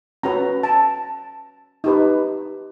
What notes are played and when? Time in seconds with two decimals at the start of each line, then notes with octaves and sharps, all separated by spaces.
0.23 C#4 F#4 B4 A#5
0.63 A5
1.84 D#4 G4 B4